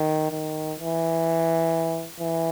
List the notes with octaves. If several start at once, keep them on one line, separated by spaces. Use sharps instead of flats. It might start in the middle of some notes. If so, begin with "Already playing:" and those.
Already playing: D#3
D#3
E3
E3